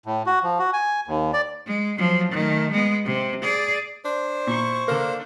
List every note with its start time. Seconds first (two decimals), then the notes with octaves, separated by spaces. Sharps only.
0.06 A2
0.26 F#4
0.43 F3
0.59 F#4
0.73 G#5
1.07 D#2
1.33 D5
1.66 G#3
1.98 F3 F#3
2.32 D#3 A3
2.72 G#3 B3
3.05 C3
3.42 G#4 D5
4.04 D4 C5
4.47 A#2 E4 C#6
4.88 D3 A#3 D4 A4 A#4